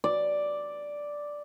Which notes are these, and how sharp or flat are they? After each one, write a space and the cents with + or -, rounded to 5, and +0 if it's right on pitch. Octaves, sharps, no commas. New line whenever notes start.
D5 +0